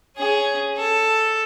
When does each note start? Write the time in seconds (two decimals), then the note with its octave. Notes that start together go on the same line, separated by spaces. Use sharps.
0.17 C#4 G#4
0.77 A4